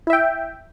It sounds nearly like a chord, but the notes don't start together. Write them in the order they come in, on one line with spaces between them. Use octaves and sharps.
E4 E5 G5